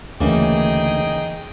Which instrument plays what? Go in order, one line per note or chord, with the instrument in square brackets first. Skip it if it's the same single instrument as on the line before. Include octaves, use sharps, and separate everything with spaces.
[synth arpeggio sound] D2 [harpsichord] C#3 E3 A#3 [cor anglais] D#4 [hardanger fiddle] G#4 G5